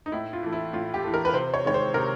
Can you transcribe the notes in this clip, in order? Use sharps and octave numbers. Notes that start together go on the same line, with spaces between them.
D#4
A2 E4
F4
E3 A3
E4
A2 F4
G4
E3 A3
A#4
B4
C3 C5
C#5
D#3 G#3 C#5
C5
C3 A#4